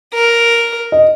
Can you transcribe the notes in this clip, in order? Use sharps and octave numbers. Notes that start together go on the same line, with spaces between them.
A#4
D#5